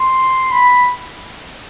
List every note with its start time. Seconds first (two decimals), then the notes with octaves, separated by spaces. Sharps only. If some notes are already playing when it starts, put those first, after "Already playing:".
Already playing: C6
0.52 B5